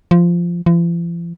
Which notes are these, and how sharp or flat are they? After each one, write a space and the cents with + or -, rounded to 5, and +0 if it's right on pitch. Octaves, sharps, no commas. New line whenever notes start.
F3 -10
F3 -45